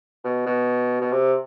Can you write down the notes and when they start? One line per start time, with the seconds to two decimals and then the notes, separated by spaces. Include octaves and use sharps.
0.24 B2
0.46 B2
1.01 B2
1.12 C3